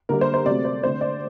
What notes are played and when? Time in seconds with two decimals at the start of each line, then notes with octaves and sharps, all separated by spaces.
0.09 D3 G3 A#3 A#4
0.21 C5
0.34 C5
0.45 C3 F#3 A3 C4 D5
0.65 C5
0.83 D3 A3 C4 C5
1.01 D5